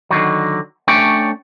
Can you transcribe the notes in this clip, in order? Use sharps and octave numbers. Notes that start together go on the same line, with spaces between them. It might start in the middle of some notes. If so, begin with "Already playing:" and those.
D3 D#3 F#3
A3 C#4 D4 C#5 G5